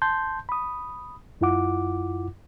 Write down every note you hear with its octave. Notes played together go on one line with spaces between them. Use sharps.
A5 C6 G6
B5 D#6
F#2 E4 F4 F#5 D6